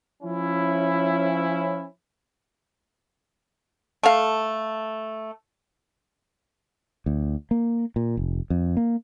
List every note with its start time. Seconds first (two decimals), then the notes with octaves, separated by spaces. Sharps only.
0.23 F3 C#4 E4
4.03 A3 F5
7.06 D2
7.51 A#3
7.96 A#2
8.17 F1
8.50 F2
8.77 A#3